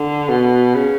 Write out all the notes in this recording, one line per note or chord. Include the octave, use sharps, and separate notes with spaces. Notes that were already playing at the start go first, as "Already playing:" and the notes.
Already playing: D3
B2
C#3